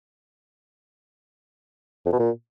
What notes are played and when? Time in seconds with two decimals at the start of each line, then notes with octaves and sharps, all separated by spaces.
2.06 F2
2.12 B2
2.19 A#2